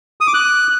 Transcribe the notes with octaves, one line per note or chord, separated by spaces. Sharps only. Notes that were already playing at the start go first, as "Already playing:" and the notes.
D#6
D6
F#6